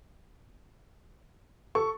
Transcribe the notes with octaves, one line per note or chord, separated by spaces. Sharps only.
A4 C#6